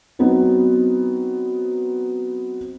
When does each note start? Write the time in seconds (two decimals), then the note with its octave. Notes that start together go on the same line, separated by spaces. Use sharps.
0.19 F#3 B3 C4 D#4 F#4